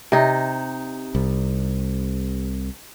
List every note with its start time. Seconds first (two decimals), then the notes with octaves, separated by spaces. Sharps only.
0.12 C3 D#4
1.15 C2